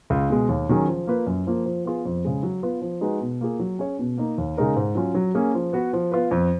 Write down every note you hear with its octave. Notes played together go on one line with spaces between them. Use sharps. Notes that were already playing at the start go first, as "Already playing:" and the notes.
C#2
B2 G#3
D#2
D#3 F#3 C#4 G#4
F3
A#3 F4 B4
F#2
F3 A#3 F4
F3
B3 F4 G#4
F2
C#3 G#3
F#3
B3 F4 B4
F3
G#3 D#4 F#4 B4
B2
A#3 F4 G#4
F#3
C#4 G#4 C#5
B2
A#3 D#4
D#2
C#3 G#3 D#4 A#4
G#2
F#3 C#4 F4
F#3
A#3 C#4 G#4
F3
B3 F#4 B4
F3
B3 F4 B4
F2